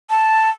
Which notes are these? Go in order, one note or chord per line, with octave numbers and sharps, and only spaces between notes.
A5